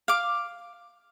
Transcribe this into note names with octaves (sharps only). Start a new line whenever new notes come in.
F5 D6